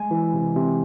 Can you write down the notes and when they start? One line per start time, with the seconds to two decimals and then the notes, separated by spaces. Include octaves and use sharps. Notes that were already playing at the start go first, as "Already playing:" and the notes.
Already playing: G#3 G#5
0.11 E3
0.34 C3
0.56 C3